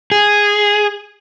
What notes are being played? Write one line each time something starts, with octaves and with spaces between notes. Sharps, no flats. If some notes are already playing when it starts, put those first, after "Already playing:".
G#4